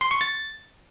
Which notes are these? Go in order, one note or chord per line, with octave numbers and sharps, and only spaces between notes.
C6
C#6
A6